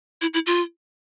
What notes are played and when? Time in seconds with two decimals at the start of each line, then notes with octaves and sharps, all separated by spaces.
0.22 E4
0.34 E4
0.46 F4